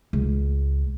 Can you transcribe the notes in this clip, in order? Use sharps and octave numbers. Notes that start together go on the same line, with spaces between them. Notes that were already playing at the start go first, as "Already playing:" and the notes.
C#2